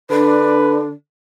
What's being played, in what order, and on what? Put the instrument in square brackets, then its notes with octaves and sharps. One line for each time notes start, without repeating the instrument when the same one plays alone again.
[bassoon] D3 [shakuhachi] D4 [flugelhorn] B4